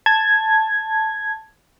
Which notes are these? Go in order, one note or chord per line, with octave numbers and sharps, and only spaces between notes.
A5 G#6